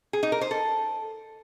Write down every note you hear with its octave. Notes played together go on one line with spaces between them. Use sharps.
G#4
D#4
A#4
C5
A4